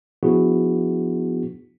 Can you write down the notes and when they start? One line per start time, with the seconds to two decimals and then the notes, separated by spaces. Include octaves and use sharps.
0.23 F3 B3 D4 E4 F#4 G#4